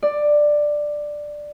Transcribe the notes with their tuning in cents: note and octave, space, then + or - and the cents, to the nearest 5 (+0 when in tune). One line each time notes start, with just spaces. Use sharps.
D5 +10